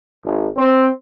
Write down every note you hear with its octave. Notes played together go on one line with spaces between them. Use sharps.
G#1
C4